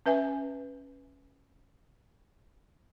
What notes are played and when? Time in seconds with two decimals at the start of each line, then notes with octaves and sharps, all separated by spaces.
0.06 C#4 B4 E5 G#5